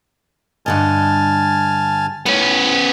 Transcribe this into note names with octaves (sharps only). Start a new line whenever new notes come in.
G2 D3 D#5 G#5 A5 F6
A3 B3 C#4 E4